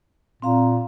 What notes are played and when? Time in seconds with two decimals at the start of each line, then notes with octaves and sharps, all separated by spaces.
0.42 A#2 C4 F5 A#5